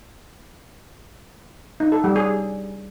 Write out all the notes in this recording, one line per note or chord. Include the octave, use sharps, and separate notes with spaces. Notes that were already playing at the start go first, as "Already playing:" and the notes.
D#4
A4
G3
G#4